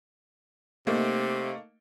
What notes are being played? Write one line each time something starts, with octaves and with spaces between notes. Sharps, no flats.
C3 A3 A#3 D#4